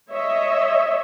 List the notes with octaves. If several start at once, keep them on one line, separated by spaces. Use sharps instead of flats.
C#5 D#5 E5